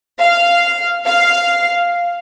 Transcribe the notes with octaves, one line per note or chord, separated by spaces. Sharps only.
F5
F5